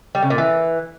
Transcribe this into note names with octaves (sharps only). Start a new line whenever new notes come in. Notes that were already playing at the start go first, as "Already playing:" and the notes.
G3
C#3
A#2
E3